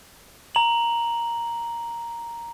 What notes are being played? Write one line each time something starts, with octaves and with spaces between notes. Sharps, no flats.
A#5 F#7